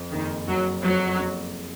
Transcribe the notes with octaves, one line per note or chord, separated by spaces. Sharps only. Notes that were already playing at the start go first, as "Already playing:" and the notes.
Already playing: F2
F#1 D#3
F#1 F#3
F2 F#3
F#1